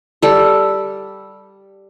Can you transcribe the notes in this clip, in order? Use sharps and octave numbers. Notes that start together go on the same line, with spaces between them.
G3 A4